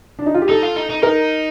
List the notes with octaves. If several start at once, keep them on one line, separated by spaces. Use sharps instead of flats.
D4
D#4
F4
G4
D#4 A4
F4
D#4
D#4
D#4 A#4